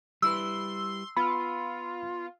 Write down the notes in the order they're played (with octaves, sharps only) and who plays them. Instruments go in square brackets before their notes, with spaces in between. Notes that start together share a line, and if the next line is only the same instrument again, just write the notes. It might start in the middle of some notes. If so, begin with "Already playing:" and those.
[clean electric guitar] G3 E4 B4 [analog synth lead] C6 [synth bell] E6
[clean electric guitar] B3 [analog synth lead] F4 [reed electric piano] B5